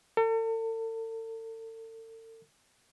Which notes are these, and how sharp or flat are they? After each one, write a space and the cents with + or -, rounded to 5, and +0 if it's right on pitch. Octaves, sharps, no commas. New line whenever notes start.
A4 +40